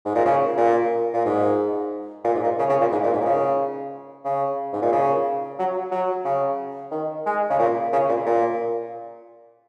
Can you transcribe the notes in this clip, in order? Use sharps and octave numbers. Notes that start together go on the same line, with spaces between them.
G#2
A#2
C#3
A#2
A#2
G#2
A#2
G#2
A#2
C#3
C#3
A#2
G#2
A#2
G#2
A#2
C#3
C#3
G#2
A#2
C#3
F#3
F#3
C#3
D#3
G#3
C#3
A#2
C#3
A#2
A#2